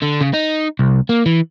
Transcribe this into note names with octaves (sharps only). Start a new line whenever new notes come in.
D3
C#3
D#4
C2
A#3
E3